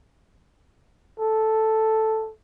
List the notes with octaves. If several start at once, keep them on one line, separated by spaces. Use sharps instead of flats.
A4